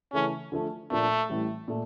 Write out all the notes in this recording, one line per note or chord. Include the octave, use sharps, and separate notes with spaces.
C#3 E3 A3 C#4
D3 F3 A3
A#2 F3 A3 A#3 D4
A1 A2 E3 G3
A#2 A3